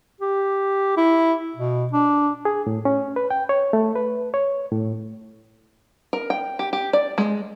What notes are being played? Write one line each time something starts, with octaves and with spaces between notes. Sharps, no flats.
G4
E4
B2
D4
G#4
A2
C#4
B4
G5
C#5
A3
B4
C#5
A2
A#4
G5
G4
G4
D5
G#3